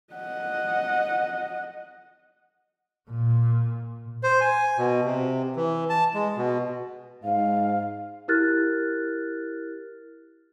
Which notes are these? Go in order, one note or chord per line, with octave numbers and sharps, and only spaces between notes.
D#5 F#5
A#2
C5
G#5
B2
C3
E3
A5
G#3
B2
G#2 F5
E4 G4 A#4 F6 F#6 A6